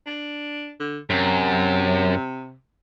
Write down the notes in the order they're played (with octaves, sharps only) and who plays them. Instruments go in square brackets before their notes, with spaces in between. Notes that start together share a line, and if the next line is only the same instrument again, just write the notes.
[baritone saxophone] D4
D3
[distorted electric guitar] F#2 [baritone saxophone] C3